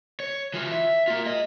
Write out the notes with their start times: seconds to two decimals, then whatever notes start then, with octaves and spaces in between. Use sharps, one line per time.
0.20 C#5
0.54 E3 F4
0.72 E5
1.08 A#3 F4
1.26 G#4 D#5